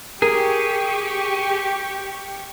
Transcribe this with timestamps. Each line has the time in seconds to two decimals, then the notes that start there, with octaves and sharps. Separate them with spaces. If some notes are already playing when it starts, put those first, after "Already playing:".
0.22 G4 G#4 A#4 C#6